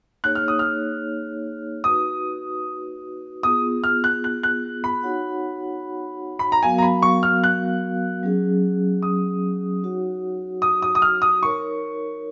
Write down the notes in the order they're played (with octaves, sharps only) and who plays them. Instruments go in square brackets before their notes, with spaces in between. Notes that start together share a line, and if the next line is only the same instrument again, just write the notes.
[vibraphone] A#3 D#4 G#4 C#5 [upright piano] F#6
[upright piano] F6
D#6
F6
[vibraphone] D#4 F#4 B4 [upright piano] D#6
[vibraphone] B3 F4 G#4 [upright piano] D#6
[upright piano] F6
F#6
F#6
F#6
B5
[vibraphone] D#4 F#4 C#5 F#5
[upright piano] B5
A#5
[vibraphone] F#3 B3 F#4 A#4 F5 [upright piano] G#5
[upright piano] A#5
B5
C#6
F6
F#6
[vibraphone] F#3 C#4 G#4
[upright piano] D#6
[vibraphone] D#4 F#4 C#5 F#5
[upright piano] D#6
D#6
D#6
F6
D#6
[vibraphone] D#4 A#4 C#5 [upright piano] C#6